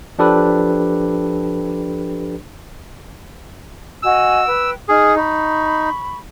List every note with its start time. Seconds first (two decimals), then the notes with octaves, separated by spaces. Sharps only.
0.19 F3 D4 G4 A4 B4
4.03 F#4 D#5 G#5 E6
4.45 B4 G5
4.89 D#4 G#4 D#6 F6
5.16 D#4 B5 C#6